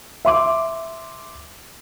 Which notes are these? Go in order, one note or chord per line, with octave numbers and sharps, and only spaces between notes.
E5 C6 D6